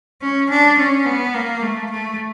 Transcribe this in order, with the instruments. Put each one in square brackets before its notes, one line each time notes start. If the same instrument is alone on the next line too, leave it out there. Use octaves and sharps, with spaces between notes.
[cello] C#4
D4
C#4
B3
A#3
A3
A3